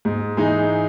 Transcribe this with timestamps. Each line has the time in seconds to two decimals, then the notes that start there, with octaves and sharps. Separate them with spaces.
0.05 G#2
0.37 E3 G#3 D#4